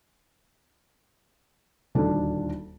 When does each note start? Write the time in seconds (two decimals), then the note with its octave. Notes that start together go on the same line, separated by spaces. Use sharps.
1.95 D#1 D2 D#3 D4 A4